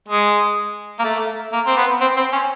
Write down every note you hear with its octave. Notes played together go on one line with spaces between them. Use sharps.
G#3
A#3
A3
A#3
C4
B3
C4
C4
C#4